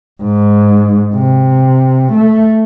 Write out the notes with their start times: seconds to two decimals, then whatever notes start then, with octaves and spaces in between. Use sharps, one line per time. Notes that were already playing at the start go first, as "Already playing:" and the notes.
0.22 G#2
1.15 C3
2.13 A3